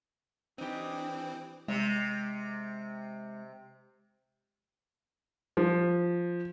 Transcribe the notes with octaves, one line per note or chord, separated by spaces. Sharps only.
E3 C4 D4 D#4 G4
C3 G#3
F3